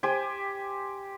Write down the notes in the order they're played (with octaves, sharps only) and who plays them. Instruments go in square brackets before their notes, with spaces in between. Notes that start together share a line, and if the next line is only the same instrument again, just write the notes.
[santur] G4 C5 G5 G#5